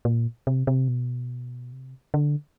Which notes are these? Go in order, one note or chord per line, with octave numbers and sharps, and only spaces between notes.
A#2
C3
C3
B2
C3
D3